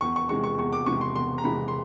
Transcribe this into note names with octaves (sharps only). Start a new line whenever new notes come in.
E2 C#6
C#6
C3 E3 G#3 C#6
C#6
E2 C#6
D6
C3 E3 G#3 C#6
C6
E2 C6
A#5
C3 E3 G#3 B5
C6